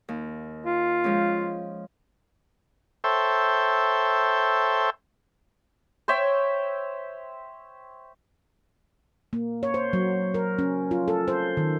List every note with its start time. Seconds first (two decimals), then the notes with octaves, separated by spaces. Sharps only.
0.09 D#2
0.66 F4
1.04 F3 G#3 C#4
3.04 A4 C5 C#5 E5 G5
6.08 C5 C#5 E5 G5
9.33 A#3
9.63 C#5
9.74 C5
9.93 F#3
10.34 A#4
10.59 C#4
10.91 F4
11.08 A4
11.28 C5
11.57 D#3